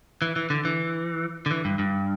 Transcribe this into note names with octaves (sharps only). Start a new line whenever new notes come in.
E3
E3
D3
E3
D3
E3
G2
G2